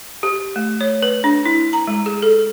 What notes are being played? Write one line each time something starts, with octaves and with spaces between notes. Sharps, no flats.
G4
A3
C#5
B4
D4
E4
A#5
G#3
G#4
A4